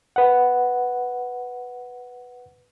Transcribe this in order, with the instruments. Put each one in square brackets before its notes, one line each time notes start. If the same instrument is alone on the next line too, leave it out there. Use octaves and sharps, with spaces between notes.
[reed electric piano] B4 F#5